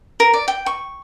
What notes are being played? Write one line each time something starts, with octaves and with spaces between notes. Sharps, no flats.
A#4
D5
G5
C#6